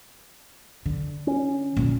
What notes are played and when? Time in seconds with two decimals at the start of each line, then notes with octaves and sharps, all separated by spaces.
0.86 D3
1.27 C#4
1.77 A#2 D3